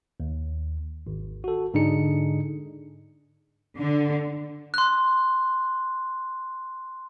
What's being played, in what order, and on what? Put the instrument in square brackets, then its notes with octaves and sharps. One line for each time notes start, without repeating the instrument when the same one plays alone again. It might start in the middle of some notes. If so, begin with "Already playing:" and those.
[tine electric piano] D#2
G#1
F#4 A4
G#2 D3 D4 D#4 G#4 C#7
[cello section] D3
[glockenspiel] C6 F#6